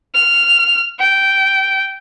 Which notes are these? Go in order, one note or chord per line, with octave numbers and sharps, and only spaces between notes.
F6
G5